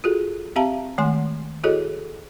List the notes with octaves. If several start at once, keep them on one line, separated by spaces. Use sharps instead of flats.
F4 F#4 G#4 A4
C4 G4 E5 F5 A5 A#5
D#3 G#3 A3 G#5 C6
E4 F#4 G#4 A4 C#5 D#5